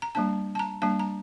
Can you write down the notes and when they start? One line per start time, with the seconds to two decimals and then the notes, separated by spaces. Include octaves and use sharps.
0.02 A#5
0.15 G3 A#3 D4 A5
0.55 A5
0.59 A#5
0.82 G3 A#3 D4 A5
0.99 A#5